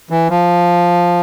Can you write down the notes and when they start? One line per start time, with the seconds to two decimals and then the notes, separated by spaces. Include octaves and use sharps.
0.10 E3
0.30 F3